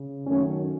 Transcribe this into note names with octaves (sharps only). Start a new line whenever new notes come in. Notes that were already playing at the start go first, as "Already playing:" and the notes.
Already playing: C#3
F#2 D#3 F#3 A3 C#4